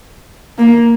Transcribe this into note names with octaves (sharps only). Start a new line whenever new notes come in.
A#3